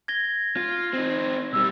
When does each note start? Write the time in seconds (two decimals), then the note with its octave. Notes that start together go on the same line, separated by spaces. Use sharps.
0.08 G#6 A#6 G7
0.57 F4
0.93 C4 D#4
1.53 B1 G3 E6